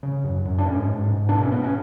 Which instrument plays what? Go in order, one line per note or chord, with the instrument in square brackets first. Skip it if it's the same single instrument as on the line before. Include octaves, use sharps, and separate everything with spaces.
[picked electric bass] C#3
F#2
F#2
D4
G#2 C#4
G#2
G#2
B2 D4
C#4
B2 B3
C#4